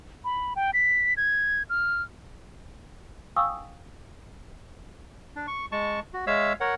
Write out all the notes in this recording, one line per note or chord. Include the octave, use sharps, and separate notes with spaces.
B5
G5
B6
G#6
F6
F5 G5 G#5 C#6 D#6 E6
D4
C#6
G#3 A5 C#6
F#4
G#3 C#5 E5 F5 E6
A#4 C#5 F#5